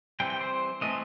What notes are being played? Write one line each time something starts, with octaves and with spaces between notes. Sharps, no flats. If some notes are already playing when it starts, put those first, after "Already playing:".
E3 G3 C4 G5
G5
C5
E3 A3 C4 D#5